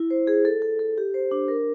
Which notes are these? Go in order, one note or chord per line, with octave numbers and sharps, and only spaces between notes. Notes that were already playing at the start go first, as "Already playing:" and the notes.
Already playing: E4
C5
G#4
A4
A4
A4
G4
C5
D4
A#4